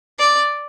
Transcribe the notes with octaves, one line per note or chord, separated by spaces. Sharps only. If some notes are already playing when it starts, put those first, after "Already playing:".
D5